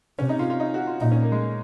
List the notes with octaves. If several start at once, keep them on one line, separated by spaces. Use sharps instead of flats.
C3 C#4
D#4
F4
F4
D#4
F#4
F4
A#2 D#4
C#4
A#3
G#3